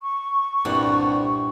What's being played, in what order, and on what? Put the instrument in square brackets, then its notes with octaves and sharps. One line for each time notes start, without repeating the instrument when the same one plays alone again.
[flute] C#6
[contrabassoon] C2 [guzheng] G2 A#2 F#5